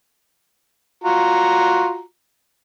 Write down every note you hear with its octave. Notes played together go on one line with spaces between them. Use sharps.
F4 F#4 A#5